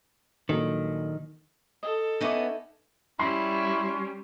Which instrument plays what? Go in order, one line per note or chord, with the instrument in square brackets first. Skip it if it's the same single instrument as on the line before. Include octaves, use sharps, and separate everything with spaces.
[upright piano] A#1 F#3 A4 [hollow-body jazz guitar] D#3
[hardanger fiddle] A4 [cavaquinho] D#5
[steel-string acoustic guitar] B3 C#4 D#5 [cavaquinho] D#4 E4 D6
[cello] G3 [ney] C#4 [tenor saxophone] E4 [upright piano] C6